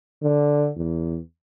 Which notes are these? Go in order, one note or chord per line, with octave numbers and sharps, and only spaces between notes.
D3
E2